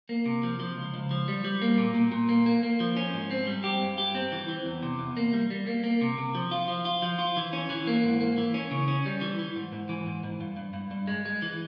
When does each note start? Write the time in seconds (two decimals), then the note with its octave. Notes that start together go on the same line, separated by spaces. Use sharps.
0.09 A#3
0.26 C3
0.43 F3
0.60 F3
0.77 C#2
0.94 C#2
1.11 F3
1.28 G3
1.45 G3
1.62 A#3
1.78 A#2
1.95 A#2
2.12 A#2
2.29 A#3
2.46 A#3
2.63 A#3
2.80 F3
2.97 C#4
3.14 G#2
3.31 C4
3.47 G3
3.64 G4
3.81 G2
3.98 G4
4.15 C4
4.32 E3
4.48 E3
4.66 E2
4.83 C3
4.99 E2
5.17 A#3
5.33 G3
5.50 G3
5.67 A#3
5.84 A#3
6.01 C3
6.18 C3
6.35 F3
6.51 F4
6.68 F3
6.85 F4
7.02 F3
7.19 F4
7.37 E3
7.53 C#4
7.70 E3
7.87 A#3
8.04 G#2
8.20 A#3
8.38 E3
8.54 C#4
8.71 C#3
8.88 C#4
9.06 G3
9.21 E3
9.39 E3
9.56 G#2
9.73 G#2
9.89 E3
10.07 G#2
10.24 G#2
10.40 G2
10.57 G2
10.74 G2
10.91 G2
11.07 G#3
11.25 G#3
11.42 E3